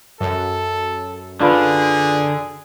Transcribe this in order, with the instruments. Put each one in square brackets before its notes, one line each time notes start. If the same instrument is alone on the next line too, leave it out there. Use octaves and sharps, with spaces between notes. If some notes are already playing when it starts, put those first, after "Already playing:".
[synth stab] F#2 [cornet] A4
[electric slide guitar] D3 [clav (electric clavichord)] D4 F4 B4 [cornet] G#4